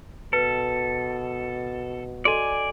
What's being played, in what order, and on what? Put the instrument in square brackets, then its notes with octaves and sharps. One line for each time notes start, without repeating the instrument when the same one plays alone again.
[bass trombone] B2 [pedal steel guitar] A4 [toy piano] B4
[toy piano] F#4 A4 D#5 [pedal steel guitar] D5 G#5